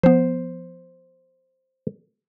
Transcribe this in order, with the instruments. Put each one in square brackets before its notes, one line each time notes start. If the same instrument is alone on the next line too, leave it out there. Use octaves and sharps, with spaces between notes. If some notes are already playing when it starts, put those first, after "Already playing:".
[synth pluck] F3 B3 [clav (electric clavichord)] C5